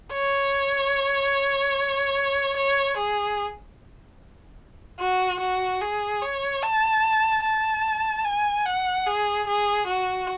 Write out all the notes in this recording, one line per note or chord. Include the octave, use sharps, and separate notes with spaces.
C#5
C#5
G#4
F#4
F#4
G#4
C#5
A5
A5
G#5
F#5
G#4
G#4
F#4